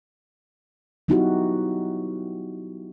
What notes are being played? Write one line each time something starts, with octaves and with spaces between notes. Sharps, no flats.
F#3 B3 D#4 E4 F#4 G4